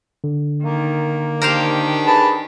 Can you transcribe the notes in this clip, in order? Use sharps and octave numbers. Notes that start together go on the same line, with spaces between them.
D3
D#3 A#3
D#3 D4 G4 A#4 C5 F5
G#4 B4 A5